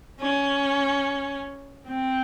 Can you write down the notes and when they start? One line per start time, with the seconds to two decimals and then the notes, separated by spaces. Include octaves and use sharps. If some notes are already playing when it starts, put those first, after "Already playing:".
0.21 C#4
1.87 C4